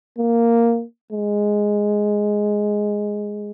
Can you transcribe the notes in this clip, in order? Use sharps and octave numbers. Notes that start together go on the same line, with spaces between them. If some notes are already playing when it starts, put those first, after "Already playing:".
A#3
G#3